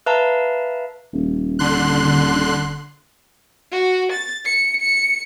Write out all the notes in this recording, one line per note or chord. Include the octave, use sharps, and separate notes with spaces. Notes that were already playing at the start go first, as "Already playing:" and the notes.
B4 E5 F5 A5 A#5
D#1
D3 C6 F#6
F#4
A6
C#7
C#7